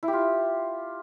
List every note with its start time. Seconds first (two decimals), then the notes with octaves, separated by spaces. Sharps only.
0.03 E4
0.08 G4
0.13 F4